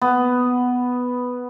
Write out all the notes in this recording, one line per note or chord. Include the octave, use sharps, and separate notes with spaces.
B3